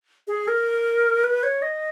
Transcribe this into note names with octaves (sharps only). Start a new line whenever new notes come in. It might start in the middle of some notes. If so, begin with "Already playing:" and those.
G#4
A#4
B4
C#5
D#5